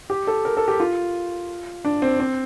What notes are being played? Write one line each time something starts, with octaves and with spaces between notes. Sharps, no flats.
G4
A4
A#4
A4
G4
F4
D4
C4
C4